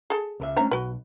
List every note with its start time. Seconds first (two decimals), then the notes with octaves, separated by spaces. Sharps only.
0.10 G#4 A4
0.40 C#2 A#4 E5
0.56 A3 C#4 D4 C5 E5 A#5
0.71 B1 F#4 B4